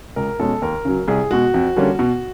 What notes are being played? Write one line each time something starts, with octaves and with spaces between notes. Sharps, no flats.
C#2 A#4
B2 G#3 C#4 A4
D#2 A#4
C#3 F#3
C2 G#4
B2 G#3 F#4
F2
D3 G3 A#3 C#4
B2